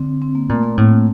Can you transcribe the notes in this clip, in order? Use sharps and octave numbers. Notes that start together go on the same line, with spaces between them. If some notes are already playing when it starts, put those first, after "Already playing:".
Already playing: D3 C4
C4
A#3
A#2 A3
A#3
A2 C4